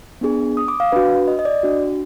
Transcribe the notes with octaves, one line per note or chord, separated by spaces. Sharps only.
B3 D4 G#4
D#6
D6
F5
D4 F#4 B4
D#5
D#5
D5
D4 F#4